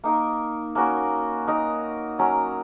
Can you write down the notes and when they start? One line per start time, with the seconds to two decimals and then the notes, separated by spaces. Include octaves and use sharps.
0.04 A#3 D#4 A#4
0.75 A#3 C#4 F#4 A#4
1.47 D#4 A#4 D#5
2.19 F#3 C#4 A#4